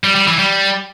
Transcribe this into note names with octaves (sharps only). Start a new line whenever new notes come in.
G3
G3
E3
G3